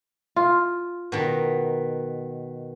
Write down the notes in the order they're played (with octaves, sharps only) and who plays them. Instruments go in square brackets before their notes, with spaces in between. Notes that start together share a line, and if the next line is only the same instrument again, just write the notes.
[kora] F4
[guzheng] B2 D#3